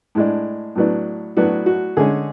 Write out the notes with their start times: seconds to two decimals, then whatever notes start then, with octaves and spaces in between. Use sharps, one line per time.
0.15 A2 G#3 D4
0.75 A2 F#3 B3 D4
1.37 A2 F#3 B3 D4 F#4
1.66 F#4
1.97 D3 G#3 C#4 G#4